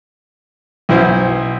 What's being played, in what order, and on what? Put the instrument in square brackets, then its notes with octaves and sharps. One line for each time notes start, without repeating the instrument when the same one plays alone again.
[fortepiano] B1 E4 C5